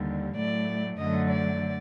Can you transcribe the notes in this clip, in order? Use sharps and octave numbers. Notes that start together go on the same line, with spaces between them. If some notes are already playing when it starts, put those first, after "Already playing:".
Already playing: D#2 D3 G3
A2 F#3 A3 D5
F#2 D3 F#3 A3 D#5
D5